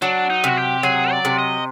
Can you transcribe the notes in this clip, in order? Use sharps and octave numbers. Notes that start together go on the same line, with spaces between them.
F#3 D4
D#4
C3 F#4
G4
F#3 G#4
D5
C3
D#5